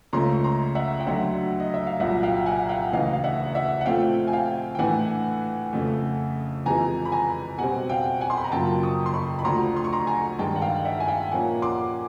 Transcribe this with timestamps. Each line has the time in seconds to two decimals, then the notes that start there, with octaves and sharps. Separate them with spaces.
0.13 C#2 C#3 F3 A3 C#4 A#5 C6
0.32 C#6
0.44 A#5 C6
0.75 E5 F#5
1.00 G5
1.06 D2 D3 F#3 E5 F#5
1.60 D#5
1.74 E5
1.87 F5
2.00 C2 A#2 F#3 E5 F#5
2.23 F5 G5
2.46 F#5 G#5
2.69 F5 G5
2.92 D2 C#3 E3 D#5 F5
3.13 F5
3.24 E5 F#5
3.55 E5 F#5
3.81 F#5
3.86 A#2 F3 A3 C4 F5 G5
4.27 G#5
4.33 F5 G5
4.75 G5
4.79 A2 E3 A3 D4 F#5 G#5
5.73 F2 C#3 F3 A3
6.66 F2 C3 E3 G#3 G#5 A#5
7.05 B5
7.12 G#5 A#5
7.58 B2 G3 C4 F#5 G#5
7.89 F5 G5
8.21 F#5 G#5
8.30 C6
8.37 B5
8.44 A#5
8.52 F#2 C#3 F3 A#3 G5 A5
8.83 C#6 D#6
9.06 C6
9.14 B5 C#6
9.39 B5
9.45 D2 D3 F3 A#5 C6
9.76 C6
9.84 C#6
9.92 A#5 C6
10.07 G#5 A#5
10.39 G2 D#3 G#3 G5 A5
10.56 F#5
10.62 F5 G5
10.85 E5 F#5
11.00 G#5
11.08 F5 G5
11.31 A#2 F3 A#3 C#4 F#5 G#5
11.62 C6 D6